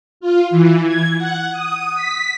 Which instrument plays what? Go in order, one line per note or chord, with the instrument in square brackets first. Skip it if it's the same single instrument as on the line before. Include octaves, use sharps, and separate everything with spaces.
[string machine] F4
E3
G#6
F#5
D#6
B6